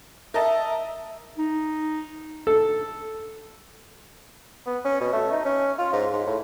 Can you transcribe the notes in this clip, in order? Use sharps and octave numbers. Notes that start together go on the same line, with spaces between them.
A#4 D#5 E5 A5
D#4
A4
B3
C#4
B2
A3
D#4
C#4
F4
G#2
G#2
A2